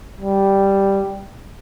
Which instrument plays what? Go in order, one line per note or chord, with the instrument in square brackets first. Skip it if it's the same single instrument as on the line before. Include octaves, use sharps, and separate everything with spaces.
[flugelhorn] G3